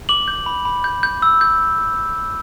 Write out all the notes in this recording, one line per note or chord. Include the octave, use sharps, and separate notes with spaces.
D6 F#7
G6
B5
B5
G6
G6
E6
G6